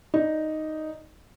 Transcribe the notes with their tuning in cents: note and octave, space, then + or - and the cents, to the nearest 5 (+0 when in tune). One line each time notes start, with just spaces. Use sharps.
D#4 +0 D5 +0